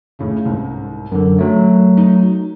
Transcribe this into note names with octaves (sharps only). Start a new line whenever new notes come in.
C#2 A2 C#3
C2 G#2
F#2 D3 A#4
F#3 A3
D#4